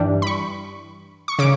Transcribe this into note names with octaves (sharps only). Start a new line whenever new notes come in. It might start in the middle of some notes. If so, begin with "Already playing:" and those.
Already playing: G2 E3 G3 D4
B5
C#6
C#6
C#3 D6